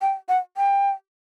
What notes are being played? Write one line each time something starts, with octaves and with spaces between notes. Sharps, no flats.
G5
F#5
G5